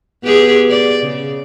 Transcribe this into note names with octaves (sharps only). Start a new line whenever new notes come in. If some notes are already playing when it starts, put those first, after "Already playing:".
B3 G4 G#4
D5
C#3